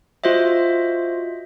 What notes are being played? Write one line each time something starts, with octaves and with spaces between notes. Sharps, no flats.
F4 F#4 C5 D#5 E5